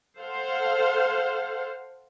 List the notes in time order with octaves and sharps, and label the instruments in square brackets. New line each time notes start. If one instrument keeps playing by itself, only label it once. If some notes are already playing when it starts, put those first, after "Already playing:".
[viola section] A4 C5 F5 F#5